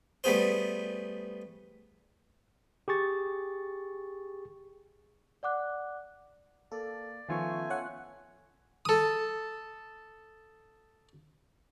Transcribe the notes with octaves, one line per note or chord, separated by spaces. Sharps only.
G3 A3 B3 G#4 C5
G4 G#4 C#6 A6
D5 F#5 D6 F#6
A#3 A4 D5
D#3 F3 A3 B3 C#4 F4 G#5 C#6
C#5 F#5
A4 D#6